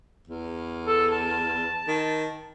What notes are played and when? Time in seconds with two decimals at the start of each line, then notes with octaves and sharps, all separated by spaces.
0.28 E2
0.85 A4
1.12 A5
1.87 D#3